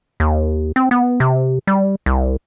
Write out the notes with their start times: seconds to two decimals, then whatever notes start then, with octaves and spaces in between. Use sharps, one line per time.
0.20 D#2
0.76 C4
0.91 B3
1.20 C3
1.67 G3
2.06 C2